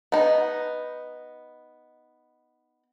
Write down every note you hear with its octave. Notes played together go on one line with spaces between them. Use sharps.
B3 D#4